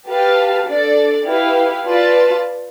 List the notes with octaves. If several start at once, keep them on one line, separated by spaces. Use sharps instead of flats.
G4 B4 F5 A5
D4 A4 D5
E4 G4 B4 F5
F4 B4 D5 A5